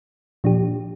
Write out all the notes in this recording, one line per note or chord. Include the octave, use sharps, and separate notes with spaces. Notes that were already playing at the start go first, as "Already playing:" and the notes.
A#2 F3 D4 G4